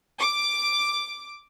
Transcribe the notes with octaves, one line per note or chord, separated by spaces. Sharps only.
D6